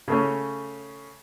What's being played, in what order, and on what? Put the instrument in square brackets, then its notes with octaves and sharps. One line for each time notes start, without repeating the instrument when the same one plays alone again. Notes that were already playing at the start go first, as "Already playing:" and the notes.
[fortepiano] C#3 A3 C#4